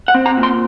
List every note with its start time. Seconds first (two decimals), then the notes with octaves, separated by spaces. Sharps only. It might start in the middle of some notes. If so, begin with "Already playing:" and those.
0.08 F#5
0.15 C4
0.26 A#5
0.37 A#2
0.43 C6